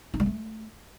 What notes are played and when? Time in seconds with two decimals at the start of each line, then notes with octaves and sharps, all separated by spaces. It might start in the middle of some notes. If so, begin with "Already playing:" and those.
0.14 D#4
0.20 G3
0.26 A3